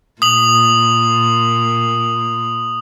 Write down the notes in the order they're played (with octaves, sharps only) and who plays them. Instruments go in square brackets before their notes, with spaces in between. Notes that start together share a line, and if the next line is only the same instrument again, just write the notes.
[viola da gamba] A#2 [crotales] D#6 F#7